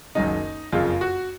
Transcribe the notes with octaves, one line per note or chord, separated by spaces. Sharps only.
F#1 F#2 D#3 D#4
F#1 F2 C#3 F4
F#4